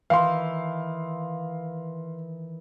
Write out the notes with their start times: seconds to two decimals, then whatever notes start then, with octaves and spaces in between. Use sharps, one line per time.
0.10 D#3 E3 F5 C6